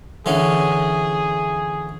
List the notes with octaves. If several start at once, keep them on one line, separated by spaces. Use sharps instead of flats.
D3 E3 C#4 G#4